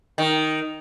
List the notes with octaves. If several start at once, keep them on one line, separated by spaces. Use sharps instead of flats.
D#3